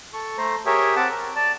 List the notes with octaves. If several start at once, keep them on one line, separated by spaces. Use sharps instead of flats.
A4 C#6
A3 C5 A#5
G4 G#4 A#4 C#5 E5 G5
C4 F#5 A5 D6
A#4
D5 A5